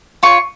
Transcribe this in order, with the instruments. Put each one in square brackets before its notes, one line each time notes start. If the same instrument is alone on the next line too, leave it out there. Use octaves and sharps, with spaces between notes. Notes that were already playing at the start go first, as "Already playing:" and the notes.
[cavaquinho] F4 C#5 C#6